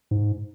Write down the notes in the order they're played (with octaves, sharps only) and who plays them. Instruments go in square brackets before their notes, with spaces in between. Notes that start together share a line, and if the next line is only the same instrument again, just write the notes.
[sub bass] G#2